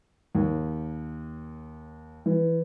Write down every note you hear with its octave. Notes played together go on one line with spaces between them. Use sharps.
D#2
E3